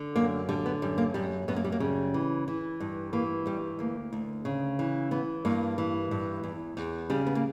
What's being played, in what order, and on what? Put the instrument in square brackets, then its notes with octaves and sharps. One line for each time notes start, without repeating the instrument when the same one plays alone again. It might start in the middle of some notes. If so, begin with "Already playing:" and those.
Already playing: [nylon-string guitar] D3
F#2 A#3
D3 G3
B3
F#2 G3
A#3
F#2 G3
F#2 B3
A#3
G3
A#3
C#3 G3
E3
E3
G2
E3 A#3
G2 G3
D2 A#3
D2
C#3
E3
E3 B3
G2 A#3
E3
G2
E2
E2
C#3 G3
B3
A#3